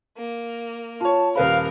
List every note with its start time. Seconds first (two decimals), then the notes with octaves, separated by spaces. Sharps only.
0.18 A#3
1.00 F4 C#5 A5
1.35 D#1 A#4 B4 F5 B5